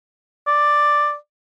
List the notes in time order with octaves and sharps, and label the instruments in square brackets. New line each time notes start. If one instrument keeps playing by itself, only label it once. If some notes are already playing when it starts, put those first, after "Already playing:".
[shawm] D5